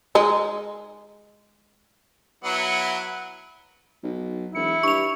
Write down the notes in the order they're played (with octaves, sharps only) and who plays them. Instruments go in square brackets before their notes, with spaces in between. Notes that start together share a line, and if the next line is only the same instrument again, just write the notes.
[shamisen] G#3 D#4
[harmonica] F#3 B3 E4
[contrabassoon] B1
[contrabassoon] E1 [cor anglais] E4 [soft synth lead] C#7
[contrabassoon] G2 [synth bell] C#6 F7